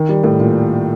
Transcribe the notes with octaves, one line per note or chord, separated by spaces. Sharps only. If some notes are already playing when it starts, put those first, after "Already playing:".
Already playing: D#3
G3
A2
A#2